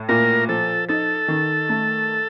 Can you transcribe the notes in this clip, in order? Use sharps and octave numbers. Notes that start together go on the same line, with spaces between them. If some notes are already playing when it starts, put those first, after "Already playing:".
Already playing: A2
A#2 A#4
F3 A4
D#4 A4
D#3
A3